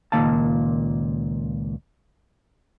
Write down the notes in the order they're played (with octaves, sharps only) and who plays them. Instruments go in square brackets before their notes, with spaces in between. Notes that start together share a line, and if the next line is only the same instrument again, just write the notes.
[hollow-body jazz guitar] C#2 A#2 D#3 A#3 F5 A5